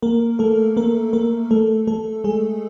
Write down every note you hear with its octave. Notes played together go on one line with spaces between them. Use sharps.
A#3 A#4
A3 A4
A#3 A#4
A#3 A#4
A3 A4
A3 A4
G#3 G#4